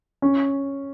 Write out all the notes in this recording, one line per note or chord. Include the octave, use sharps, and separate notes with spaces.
C#4